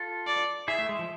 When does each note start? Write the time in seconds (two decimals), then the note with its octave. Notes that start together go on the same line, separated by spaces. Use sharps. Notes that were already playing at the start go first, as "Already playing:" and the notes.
Already playing: F4 A4
0.27 D5
0.68 E4 G#4 E5
0.79 A3
0.89 G#3
0.99 F3